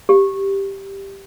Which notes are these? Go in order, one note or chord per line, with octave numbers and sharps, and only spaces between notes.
G4